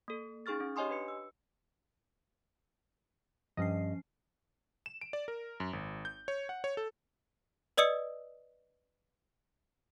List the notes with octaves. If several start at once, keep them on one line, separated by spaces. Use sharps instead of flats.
A#3 A4
C#4 D#4 G#4 C#6 F6 A6
C#4
G4 C#5 D#5 G#5 C6 D#6
D4 B4 C#7
E6
G2 F3 C#4 D#5 C7
E7
D7
D5
A#4
F#2
G#1
G6
C#5
F#5
C#5
A4
B4 D5 D#5 D#6 E6 C#7